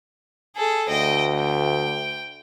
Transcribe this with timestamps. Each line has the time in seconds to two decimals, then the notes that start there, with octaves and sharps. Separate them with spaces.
0.56 G#4 A4
0.89 D2 D#5 G5
1.37 G5